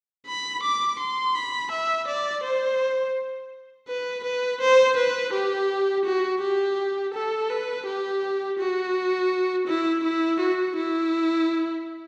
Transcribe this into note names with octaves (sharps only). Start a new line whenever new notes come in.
B5
D6
C6
B5
E5
D5
C5
B4
B4
C5
B4
G4
F#4
G4
A4
B4
G4
F#4
E4
E4
F#4
E4